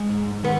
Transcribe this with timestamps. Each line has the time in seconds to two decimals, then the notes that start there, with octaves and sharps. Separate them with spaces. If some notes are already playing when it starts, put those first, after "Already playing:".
Already playing: G#3
0.09 G#2
0.43 D#3 B3